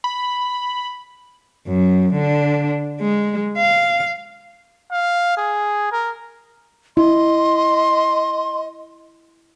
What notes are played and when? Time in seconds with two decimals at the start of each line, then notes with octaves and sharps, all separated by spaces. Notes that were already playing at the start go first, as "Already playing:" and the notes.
0.04 B5
1.67 F#2
2.14 D3 D4
3.01 G#3
3.58 F5
4.92 F5
5.37 G#4
5.92 A#4
6.97 E4 D#5 C6